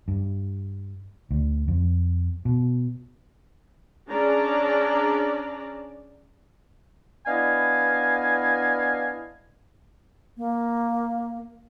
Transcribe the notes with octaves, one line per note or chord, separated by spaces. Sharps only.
G2
D2
F2
B2
C#4 D4 G#4 D5 A5 A#5
B3 D4 E4 D#5 F5 G#5
A#3